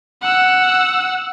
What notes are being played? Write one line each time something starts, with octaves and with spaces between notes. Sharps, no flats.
F#5 E6